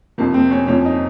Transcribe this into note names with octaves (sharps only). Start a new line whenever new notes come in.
F2 C3 F3 A#3
C4
C#4
F2 C3 F3 C#4
D#4